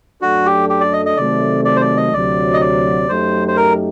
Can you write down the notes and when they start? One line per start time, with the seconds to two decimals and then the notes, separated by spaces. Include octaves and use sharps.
0.21 F#2 F#3 A3 D4 F#4 A4
0.46 G4
0.69 G4
0.80 D5
0.93 D#5
1.06 D#5
1.16 C3 D#3 F#3 A3 C4 D5
1.65 D5
1.76 C5
1.81 D5
1.97 D#5
2.13 D2 C3 F#3 D5
2.54 D#5
2.61 D5
3.09 F#2 F#3 A3 D#4 G4 C5
3.48 C5
3.57 A#4